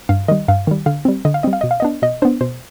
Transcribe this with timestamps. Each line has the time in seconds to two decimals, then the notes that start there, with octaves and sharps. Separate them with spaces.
0.09 G2 F5
0.28 D#3 G3 D#5
0.48 G2 F5
0.67 D#3 G3
0.86 D3 F5
1.05 G3 C4
1.25 D3 D#5
1.34 F5
1.43 G3 C4 D#5
1.53 F5
1.61 B2 D#5
1.71 F5
1.80 B3 D4 D#5
2.02 B2 D#5
2.22 B3 D4 C5
2.41 B2 C5